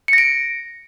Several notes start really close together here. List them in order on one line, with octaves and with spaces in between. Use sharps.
C#7 A#6 D7